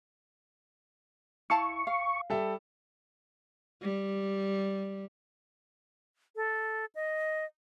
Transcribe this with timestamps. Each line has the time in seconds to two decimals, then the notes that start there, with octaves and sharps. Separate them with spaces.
1.50 E4 F5 A5 C#6
1.87 F5
2.30 G3 A4 E5
3.82 G3
6.36 A4
6.95 D#5